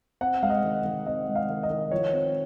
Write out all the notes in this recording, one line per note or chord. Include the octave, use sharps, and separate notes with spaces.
C4 F#5
G#3 F5
D#5
D#3
D#3
C4 D#5
G#3
F5
D#3
D#5
D#3
F3 C#5
C4